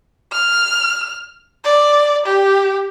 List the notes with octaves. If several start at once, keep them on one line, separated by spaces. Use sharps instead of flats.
F6
D5
G4